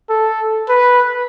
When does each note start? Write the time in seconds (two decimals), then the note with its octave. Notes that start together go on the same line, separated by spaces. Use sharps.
0.10 A4
0.69 B4